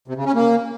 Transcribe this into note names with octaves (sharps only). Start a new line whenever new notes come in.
C3
C#3
C#4
A#3